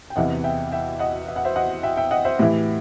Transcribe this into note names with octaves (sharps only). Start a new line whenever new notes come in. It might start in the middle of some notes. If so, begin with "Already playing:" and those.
G5
E2 C3 E3 D#5 F#5
E5 G5
E5 G5
D#5 F#5
E5
F#5
C5 E5
D#5 F#5
E5 G5
E5 G5
D#5 F#5
C5 E5
A2 E3 E4 G4